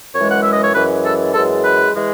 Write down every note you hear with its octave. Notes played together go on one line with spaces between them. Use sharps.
F#2 E3 G#3 C#5
F#5
E5
D#5
C#5
F#2 E3 G#3 B4
A4
F#2 E3 G#3 A4
B4
E3 G#3